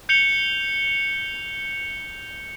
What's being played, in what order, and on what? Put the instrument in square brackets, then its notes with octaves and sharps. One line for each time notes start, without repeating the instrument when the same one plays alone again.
[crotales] G6 C#7 F7 G7